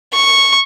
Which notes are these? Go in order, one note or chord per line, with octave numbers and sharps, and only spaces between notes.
C#6